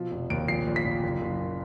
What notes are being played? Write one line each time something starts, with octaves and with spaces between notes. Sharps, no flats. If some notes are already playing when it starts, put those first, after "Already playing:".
Already playing: B2 F3
F1
D#2 D7
A#1 C7
A#1
B6
A#2
F#1
F#1